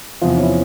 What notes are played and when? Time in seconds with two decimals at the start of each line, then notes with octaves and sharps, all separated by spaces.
0.21 E2 C3 F3 F4
0.29 E4
0.37 C#4
0.43 E4